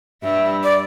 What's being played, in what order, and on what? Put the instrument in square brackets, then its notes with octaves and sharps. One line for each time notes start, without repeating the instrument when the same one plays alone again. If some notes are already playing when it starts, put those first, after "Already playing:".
[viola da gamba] G2 G3 [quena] E5
[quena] D5